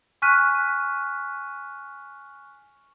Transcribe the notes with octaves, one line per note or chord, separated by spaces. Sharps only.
G#5 C#6 F6 F#6 B6 D#7